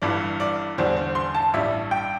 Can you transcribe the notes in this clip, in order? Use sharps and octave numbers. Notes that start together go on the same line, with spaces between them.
G1 G2 E3 G3 D5
D5
E2 D3 G3 C5
C5
C6
A5
A1 G2 G3 E5
G5